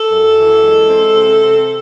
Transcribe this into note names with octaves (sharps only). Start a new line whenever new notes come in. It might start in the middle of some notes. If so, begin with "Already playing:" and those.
Already playing: A4
F#2
E3
G#3
C4
C3
C4